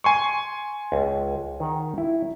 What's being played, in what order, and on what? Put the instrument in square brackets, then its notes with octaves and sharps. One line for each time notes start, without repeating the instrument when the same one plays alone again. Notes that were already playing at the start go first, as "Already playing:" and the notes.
[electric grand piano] G#5 C6 C#6
[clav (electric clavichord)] C#2
D#3 F#5
E4